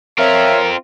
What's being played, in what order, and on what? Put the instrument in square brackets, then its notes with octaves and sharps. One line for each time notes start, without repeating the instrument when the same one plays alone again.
[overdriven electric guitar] C4 F4 [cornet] A#4 [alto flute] C#5 [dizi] E5